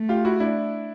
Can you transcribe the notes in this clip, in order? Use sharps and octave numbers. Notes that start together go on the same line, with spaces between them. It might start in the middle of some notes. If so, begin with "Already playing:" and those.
Already playing: A3
F4 G4
E4 F#4
D4 E4